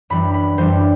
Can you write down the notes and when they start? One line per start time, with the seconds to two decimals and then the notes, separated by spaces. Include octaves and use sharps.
0.10 F#2 E3 G3 D4 B5
0.34 B5
0.58 F#2 E3 G3 D4 C5